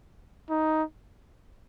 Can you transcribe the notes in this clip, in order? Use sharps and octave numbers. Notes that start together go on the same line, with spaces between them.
D#4